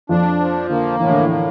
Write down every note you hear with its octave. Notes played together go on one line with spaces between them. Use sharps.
F2 F3 D4
F3
D3 A#3
A2 E3
D3
E3
A#3